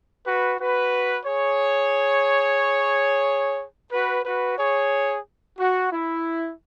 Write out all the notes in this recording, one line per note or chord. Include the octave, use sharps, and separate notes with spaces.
F#4 B4
F#4 B4
G#4 C#5
F#4 B4
F#4 B4
G#4 C#5
F#4
E4